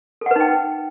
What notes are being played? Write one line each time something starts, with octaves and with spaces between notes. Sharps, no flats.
D#4 A4 B4 F#5 G5